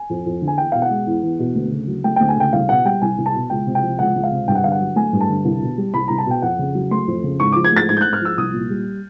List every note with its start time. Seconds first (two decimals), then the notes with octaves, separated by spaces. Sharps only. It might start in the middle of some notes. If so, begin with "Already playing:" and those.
Already playing: G#5
0.10 F2
0.26 F2
0.42 D3
0.47 G#5
0.58 E2 G5
0.72 B2 F5
0.82 F#5
0.90 G#3
1.06 E2
1.23 E2
1.39 B2
1.55 D2
1.72 C#3
1.88 F#3
2.04 A3 G5
2.16 D2 G5
2.28 G#5
2.37 C#3 G5
2.53 C2 F5
2.69 B2 F#5
2.85 G3 G5
3.02 C2 G#5
3.18 C2
3.26 A5
3.35 B2
3.50 C#2 G5
3.67 C3
3.75 G5
3.82 F3
3.99 C#2 F#5
4.15 C#2
4.24 F5
4.31 C3
4.48 G2 G5
4.55 F#5
4.64 D3 F5
4.72 F#5
4.80 F#3
4.96 A3 G#5
5.13 G2
5.21 A5
5.29 D3
5.45 C2
5.62 B2
5.78 G3
5.94 C2 B5
6.08 C2 A#5
6.18 A5
6.26 B2 G5
6.42 F2 F#5
6.59 C#3
6.75 F#3
6.91 A3 C6
7.07 F2
7.24 C#3
7.40 G#2 C#6
7.52 F3 D6
7.64 G#6
7.72 A3 A6
7.89 G#2 G#6
7.97 G6
8.01 G#2 F#6
8.13 F6
8.21 F3 E6
8.37 C2 D#6
8.54 A#2
8.70 G3